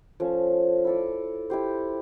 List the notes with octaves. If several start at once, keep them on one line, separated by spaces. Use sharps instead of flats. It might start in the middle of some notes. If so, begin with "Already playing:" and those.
F3 A3 C#4
E4 A4 D5
E4 G4 C5